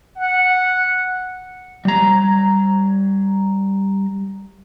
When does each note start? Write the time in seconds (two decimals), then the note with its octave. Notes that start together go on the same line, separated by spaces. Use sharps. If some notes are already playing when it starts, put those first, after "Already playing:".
0.17 F#5
1.85 G3 A#5